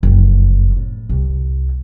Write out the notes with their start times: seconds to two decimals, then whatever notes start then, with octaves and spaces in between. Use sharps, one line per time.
0.03 F#1 F2
0.76 A2
1.09 C2